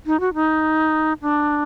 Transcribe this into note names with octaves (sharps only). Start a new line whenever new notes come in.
D#4
F#4
D#4
D4